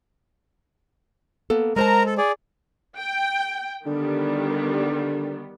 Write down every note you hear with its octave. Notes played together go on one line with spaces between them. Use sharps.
A#3 B3 A4
G#3 A#4 C5 A5 A#5
A4
G#4 D5
G5
D3 D#3 G3 B3